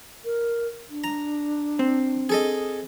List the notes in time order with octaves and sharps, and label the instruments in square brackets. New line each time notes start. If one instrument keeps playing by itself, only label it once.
[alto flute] A#4
D4
[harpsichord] A#5
[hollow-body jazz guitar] C4
[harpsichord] G#4 A4 D#5